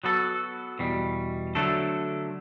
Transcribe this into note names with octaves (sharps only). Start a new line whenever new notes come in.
F#3 B3 F#4 A4
E2 B2 G3
D3 F#3 A3 D4 A4